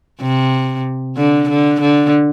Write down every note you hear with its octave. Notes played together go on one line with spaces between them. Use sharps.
C3
D3
D3
D3